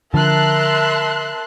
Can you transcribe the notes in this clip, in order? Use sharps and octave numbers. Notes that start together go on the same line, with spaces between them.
D3 F3 A#4 E5 A5 C6 F#6